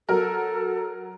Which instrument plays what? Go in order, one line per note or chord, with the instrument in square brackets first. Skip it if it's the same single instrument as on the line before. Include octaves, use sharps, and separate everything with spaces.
[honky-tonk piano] F#3 A#4 [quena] A4